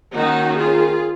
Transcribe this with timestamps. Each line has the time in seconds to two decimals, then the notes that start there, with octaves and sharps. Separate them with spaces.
0.14 D#3 A#3 C#4 D#4 F#4
0.56 F4 G#4